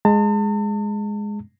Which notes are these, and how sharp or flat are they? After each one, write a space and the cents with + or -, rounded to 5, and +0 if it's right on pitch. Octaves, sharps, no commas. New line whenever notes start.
G#3 +0 A5 +40